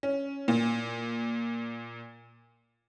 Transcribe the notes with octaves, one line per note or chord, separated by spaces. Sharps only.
C#4
A#2